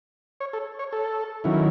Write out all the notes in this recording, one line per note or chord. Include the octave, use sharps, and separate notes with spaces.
C#5
A4
C#5
A4
D#3 F#3 C#4 E4